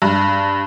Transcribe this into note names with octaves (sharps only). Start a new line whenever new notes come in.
G2